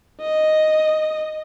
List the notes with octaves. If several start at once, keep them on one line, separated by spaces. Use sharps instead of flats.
D#5